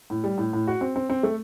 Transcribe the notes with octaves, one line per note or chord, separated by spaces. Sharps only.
A2
G3
A2
A2
F#4
C4
C4
C4
A3